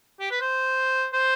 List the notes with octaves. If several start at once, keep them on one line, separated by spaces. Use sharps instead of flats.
G4
B4
C5
C5